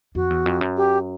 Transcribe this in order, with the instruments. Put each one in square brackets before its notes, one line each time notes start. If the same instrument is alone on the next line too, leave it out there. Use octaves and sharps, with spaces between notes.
[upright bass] F2 [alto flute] F#4
[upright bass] E2
F2
F#2
[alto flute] G4